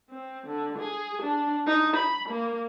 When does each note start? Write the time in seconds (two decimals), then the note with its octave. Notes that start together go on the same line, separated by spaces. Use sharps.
0.10 C4
0.47 D3
0.79 G#4
1.22 D4
1.67 D#4
1.96 B5
2.29 A#3